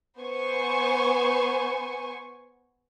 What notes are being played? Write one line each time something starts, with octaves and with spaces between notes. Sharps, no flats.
B3 C5 G#5 C#6